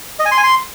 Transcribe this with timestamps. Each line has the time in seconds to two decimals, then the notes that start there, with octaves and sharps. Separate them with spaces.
0.19 D#5
0.25 G#5
0.31 C6
0.37 G#5
0.44 C6